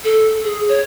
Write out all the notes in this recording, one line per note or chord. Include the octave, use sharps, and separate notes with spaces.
A4
G#4
C#5